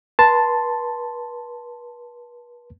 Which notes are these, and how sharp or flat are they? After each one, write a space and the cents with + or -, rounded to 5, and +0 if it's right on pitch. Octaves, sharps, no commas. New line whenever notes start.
B4 -40 A5 +0 C6 -5